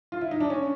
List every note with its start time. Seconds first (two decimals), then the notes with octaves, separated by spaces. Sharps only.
0.12 F4
0.21 E4
0.31 D#4
0.40 D4
0.50 C#4